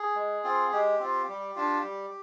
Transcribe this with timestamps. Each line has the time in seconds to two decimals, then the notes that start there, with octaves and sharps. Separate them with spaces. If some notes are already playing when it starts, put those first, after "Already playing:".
Already playing: G#4
0.16 G#3
0.44 C4 F4
0.72 G#3 G4
1.00 C4 F4
1.29 G3
1.56 D4 F4
1.84 G3